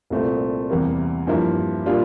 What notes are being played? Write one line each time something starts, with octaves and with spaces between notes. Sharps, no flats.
C2 A#2 A3 C4
E2 C3 G3 A#3
G2 F3 A#3 E4 A#4
A#2 G3 D4 F4